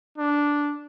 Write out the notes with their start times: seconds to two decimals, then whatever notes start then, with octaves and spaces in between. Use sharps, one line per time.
0.18 D4